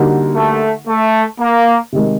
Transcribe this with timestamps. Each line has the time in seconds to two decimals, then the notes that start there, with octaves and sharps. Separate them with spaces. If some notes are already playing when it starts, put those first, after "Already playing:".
Already playing: D3 G3 A#3 D#4 F#4
0.35 A3
0.88 A3
1.40 A#3
1.92 C3 D#3 G#3